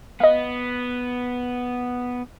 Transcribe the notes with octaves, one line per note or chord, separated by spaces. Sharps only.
B3 D#5 F5